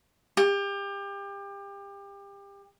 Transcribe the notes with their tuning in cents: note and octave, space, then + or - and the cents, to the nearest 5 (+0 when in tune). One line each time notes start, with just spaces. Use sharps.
G4 +30